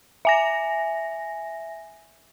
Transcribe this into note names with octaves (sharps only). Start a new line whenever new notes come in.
E5 G#5 A#6